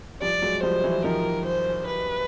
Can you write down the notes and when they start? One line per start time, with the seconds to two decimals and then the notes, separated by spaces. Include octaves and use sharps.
0.21 F3 G3 D5
0.42 F#3 G#3
0.63 F3 G3 C5
0.84 E3 F#3
1.04 D#3 F3 A#4
1.46 C5
1.87 B4